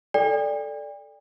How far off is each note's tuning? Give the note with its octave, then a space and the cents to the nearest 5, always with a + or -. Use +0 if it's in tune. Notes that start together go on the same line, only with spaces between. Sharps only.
A4 +0 D5 +0 G5 +40